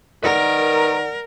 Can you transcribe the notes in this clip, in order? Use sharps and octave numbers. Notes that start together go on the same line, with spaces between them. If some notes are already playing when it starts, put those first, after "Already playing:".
D#3 A#4 B4 D5 F#5 A#5